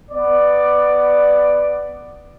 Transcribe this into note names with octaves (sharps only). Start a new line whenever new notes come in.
B3 D5